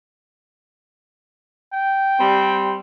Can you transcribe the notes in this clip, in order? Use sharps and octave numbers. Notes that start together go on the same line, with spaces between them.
G5
G3 C4